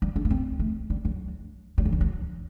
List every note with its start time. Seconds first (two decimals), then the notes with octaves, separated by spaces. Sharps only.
0.02 G3
0.16 D4
0.25 A#3
0.30 C4
0.60 A3
0.90 G3
1.05 F#3
1.78 G3
1.85 F#3
1.92 D#3
2.01 F#3